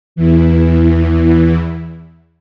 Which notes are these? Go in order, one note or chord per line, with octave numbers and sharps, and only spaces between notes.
E2 E3